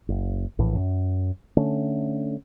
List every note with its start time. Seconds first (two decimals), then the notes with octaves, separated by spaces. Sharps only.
0.09 F#1
0.59 A#1 A2 E3
0.76 F#2
1.57 D3 A3 C#4